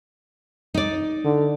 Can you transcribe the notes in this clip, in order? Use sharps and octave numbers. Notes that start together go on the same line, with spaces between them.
D#4 D5
D3